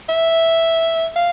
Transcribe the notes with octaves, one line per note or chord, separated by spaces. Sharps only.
E5
F5